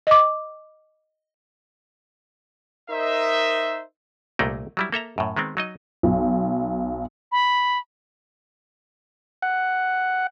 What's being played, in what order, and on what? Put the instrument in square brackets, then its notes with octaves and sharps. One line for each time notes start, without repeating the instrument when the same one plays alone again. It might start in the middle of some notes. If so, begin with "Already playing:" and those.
[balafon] D#5 D6
[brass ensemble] D#4 A#4 C5 D#5 E5
[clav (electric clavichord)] C2 A#2 A3 A#3 D#4 G5
F#3 G3 E4
A#3 A4 E5 A#5
F#2 A2
D#3 G#3 B3 C4
F#3 D#4 D#5
[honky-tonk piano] B1
[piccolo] B5
[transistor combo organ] F#5